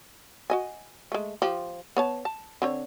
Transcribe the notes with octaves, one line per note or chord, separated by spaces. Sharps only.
F#4 D#5 G#5
G#3 A3
F3 G4
B3 C#5 A5
A5
D3 C4 C#5